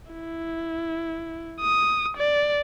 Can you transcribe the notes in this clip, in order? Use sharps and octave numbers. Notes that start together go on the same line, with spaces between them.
E4
D#6
D5